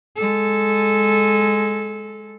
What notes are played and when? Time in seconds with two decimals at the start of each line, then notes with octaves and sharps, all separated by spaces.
0.16 G#3 A4